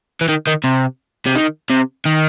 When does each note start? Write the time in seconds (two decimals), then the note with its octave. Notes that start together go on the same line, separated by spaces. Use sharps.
0.21 E3
0.29 D#3
0.47 D#3
0.64 C3
1.26 C3
1.35 D#3
1.70 C3
2.06 D#3